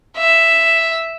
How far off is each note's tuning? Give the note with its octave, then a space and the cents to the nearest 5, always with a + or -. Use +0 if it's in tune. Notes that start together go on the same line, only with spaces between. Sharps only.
E5 +0